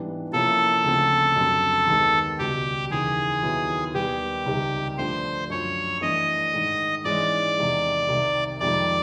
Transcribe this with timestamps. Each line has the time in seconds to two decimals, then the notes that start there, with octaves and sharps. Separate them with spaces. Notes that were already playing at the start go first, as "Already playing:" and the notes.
Already playing: G#2 E3 G3 B3 D4
0.32 C3 F3 A#3 C#4 E4 A4
0.84 D2 C#3 F3 A3 C4
1.36 F#2 D3 G3 C4
1.87 D#2 D#3 G#3 B3
2.39 C#2 B2 G3 G4
2.91 D#2 C#3 E3 G#4
3.43 D#2 D#3 F#3 B3 E4
3.94 D#2 D#3 G3 B3 G4
4.46 C#2 C3 D#3 G3
4.98 G2 D3 F3 A3 C5
5.50 F#2 D3 F3 C#5
6.01 G2 E3 A3 D4 D#5
6.53 G#2 D#3 G#3
7.05 G#2 E3 G#3 C#4 D5
7.57 E2 C3 D#3 G#3
8.08 C2 C3 D#3
8.60 F2 C3 D#3 G#3 D5